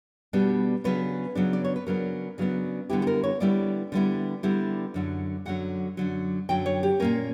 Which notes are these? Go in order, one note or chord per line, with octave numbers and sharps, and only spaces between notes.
B2 G3 B3 D4
C#3 F#3 B3 D4 B4
C#3 F#3 B3 D4
D5
C#5
B4
C#3 F#3 B3 D4 A#4
C#3 F#3 B3 D4
D3 G3 B3 E4 G4
G4
A#4
C#5
D3 G3 B3 E4 D5
D3 G3 B3 E4
D3 G3 B3 E4
F#2 D3 F#3
F#2 D3 F#3 F#5
F#2 D3 F#3
F#2 D3 F#3 G5
C#5
G4
A#2 A#3 C#4 A#4